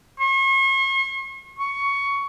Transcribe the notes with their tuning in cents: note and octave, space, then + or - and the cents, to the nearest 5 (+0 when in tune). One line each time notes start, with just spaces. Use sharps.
C#6 -45
C#6 +15